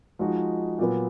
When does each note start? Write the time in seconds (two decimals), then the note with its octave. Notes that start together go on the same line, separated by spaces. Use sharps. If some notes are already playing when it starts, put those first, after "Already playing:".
0.19 F3 G#3 D#4 F#4
0.79 A#2 F#3 B3